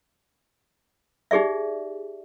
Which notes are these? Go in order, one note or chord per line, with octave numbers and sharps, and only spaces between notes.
D#4 G4 G#4 D5 E5